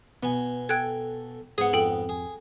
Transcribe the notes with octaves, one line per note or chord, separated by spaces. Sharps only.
B2 B3 G#5
A4 G5 F#6 G#6
G#2 B3 G#4 F#5 D#6
F2 A4 G5 F#7
G#4